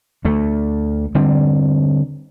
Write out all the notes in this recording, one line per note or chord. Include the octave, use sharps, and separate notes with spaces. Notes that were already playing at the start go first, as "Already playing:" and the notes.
D2 A3
D3 G3 C4